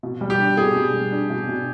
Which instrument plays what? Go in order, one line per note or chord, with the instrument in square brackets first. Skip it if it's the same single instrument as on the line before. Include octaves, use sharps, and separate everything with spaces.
[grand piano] B2
G3
[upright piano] G4
[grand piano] D4
[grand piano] B2 [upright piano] G#4
[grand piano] B2
G3
D4
B2
B2